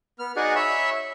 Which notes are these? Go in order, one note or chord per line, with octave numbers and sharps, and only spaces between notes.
B3 F6
D#4 F#4 G#4 D5 F#5 G#5
C#5 E5 B5 E6